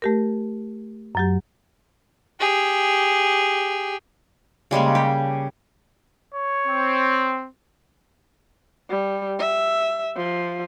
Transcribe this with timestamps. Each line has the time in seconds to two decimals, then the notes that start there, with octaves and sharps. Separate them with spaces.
0.02 A3 G4 A#4
1.15 F#2 F#3 G4
2.40 G4 G#4
4.71 C#3 G3 G#3 A#3
4.95 G4
6.35 C#5
6.67 C4
8.90 G3
9.39 E5
10.16 F3